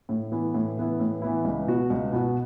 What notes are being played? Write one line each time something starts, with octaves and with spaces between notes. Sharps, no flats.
A2
E3 B3 E4
A2
E3 B3 E4
A2
E3 B3 E4
C#2
B2 B3 F#4
C#2
B2 B3 F#4